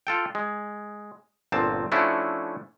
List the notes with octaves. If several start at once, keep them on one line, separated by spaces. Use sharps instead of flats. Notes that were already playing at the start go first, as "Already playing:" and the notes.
F4 A4 G5
G#3
G1 A#2 C4 A5
F3 A3 C#4 D4 E4 F#4